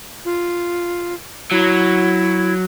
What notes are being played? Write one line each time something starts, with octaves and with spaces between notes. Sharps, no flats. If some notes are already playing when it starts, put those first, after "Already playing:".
F4
F#3 E4